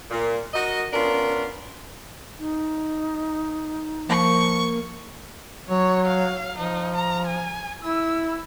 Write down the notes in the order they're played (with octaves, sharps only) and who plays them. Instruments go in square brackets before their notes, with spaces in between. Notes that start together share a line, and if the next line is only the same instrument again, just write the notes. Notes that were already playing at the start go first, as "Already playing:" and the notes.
[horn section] A#2
F#4 A#4 D#5
B3 C#4 D4 F4 A#4
[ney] D#4
[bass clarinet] F3 [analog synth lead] A#3 [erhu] C#6
[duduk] F#3 [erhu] C#5
[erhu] F5
[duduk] F3 [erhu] D#4
[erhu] A#5
G#5
[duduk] E4 [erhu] E6